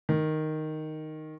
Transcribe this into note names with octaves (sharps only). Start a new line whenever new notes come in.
D#3